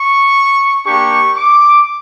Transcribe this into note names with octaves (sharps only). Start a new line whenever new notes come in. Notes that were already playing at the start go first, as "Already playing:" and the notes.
Already playing: C#6
A#3 D4 G4 C#6
D6